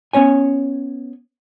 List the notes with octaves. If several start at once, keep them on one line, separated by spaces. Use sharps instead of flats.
B3 C#4 C#5 G#5